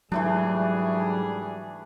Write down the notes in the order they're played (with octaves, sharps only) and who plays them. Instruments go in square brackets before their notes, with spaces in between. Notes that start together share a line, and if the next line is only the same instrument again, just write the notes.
[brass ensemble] G#2 G3 G#4 [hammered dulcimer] E3 A3 D4 [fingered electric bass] F#3